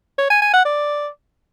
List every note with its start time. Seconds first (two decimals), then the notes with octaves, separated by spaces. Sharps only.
0.19 C#5
0.30 G#5
0.42 G#5
0.54 F#5
0.65 D5